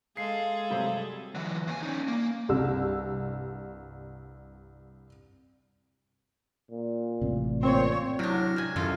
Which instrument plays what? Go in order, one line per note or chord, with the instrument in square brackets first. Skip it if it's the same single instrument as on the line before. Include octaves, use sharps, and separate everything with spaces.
[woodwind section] G#3 [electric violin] G#4 A4 [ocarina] F5 [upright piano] C7
[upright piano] C3 F#3 G3
[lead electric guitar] E3 F#3
D#2 G#5
C#4 D#4
A#3
[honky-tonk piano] C2 G2 E6
[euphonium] A#2
[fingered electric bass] A1 A2 C3
[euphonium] A#2 [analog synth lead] C4 [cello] C#5
[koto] C3 D4 [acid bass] F#3 [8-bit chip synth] E4 F6 A#6
[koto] C3 G#5
[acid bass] F#2 [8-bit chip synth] D#3 E4 [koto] F4 A4